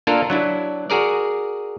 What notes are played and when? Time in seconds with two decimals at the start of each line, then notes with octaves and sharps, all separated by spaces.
0.07 A#3 D4 F4 A4 A#4
0.30 F#3 D4 E4
0.90 F#4 G#4 A#4 D5